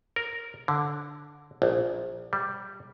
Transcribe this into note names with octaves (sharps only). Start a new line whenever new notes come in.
A#4
D3
A#1
G3